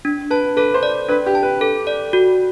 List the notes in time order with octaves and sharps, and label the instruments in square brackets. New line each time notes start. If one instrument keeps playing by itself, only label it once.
[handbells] D4
[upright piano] B4 [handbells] A5
[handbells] A4 [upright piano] B4
[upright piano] C5
[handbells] D5
[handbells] D4 [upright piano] B4
[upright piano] G4
[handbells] A5
[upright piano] B4
[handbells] A4
D5
F#4